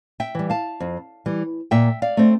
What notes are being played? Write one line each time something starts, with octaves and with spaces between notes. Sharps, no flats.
E5 G5
E3 G3
F5 A5
F2
E3 G3
A#2 E5 G5
D5 F5
A3 C4